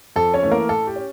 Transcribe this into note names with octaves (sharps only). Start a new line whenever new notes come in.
F2 A4
C#4 C#5
E3 A3
A#3 A#4
A2 A4
G4
C#4